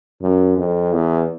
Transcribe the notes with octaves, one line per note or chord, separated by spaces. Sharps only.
F#2
F2
E2